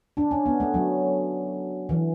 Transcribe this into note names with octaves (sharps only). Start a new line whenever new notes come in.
D4
C#4
B3
A3
F#3
E3